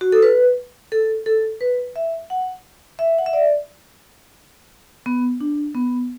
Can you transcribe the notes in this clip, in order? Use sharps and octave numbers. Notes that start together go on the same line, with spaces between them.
F#4
A4
B4
A4
A4
B4
E5
F#5
E5
F#5
E5
D5
B3
D4
B3